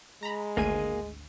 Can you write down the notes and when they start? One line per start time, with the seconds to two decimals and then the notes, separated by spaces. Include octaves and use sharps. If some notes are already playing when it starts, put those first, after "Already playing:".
0.23 G#3 A#5 B5
0.57 G#1 D2 A#3 G#4 D#7